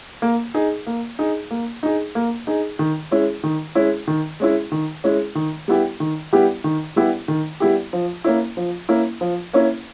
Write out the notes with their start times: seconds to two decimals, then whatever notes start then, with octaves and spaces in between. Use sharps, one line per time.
0.22 A#3
0.54 D#4 G#4
0.87 A#3
1.19 D#4 G#4
1.51 A#3
1.83 D#4 G#4
2.15 A#3
2.47 D#4 G#4
2.79 D#3
3.11 G#3 C#4 E4
3.43 D#3
3.75 G#3 C#4 E4
4.08 D#3
4.40 G#3 C#4 E4
4.72 D#3
5.04 G#3 C#4 E4
5.35 D#3
5.68 G3 B3 E4 G4
6.00 D#3
6.33 G3 B3 E4 G4
6.64 D#3
6.96 G3 B3 E4 G4
7.28 D#3
7.60 G3 B3 E4 G4
7.93 F3
8.24 A#3 C#4 E4
8.57 F3
8.89 A#3 C#4 E4
9.21 F3
9.53 A#3 C#4 E4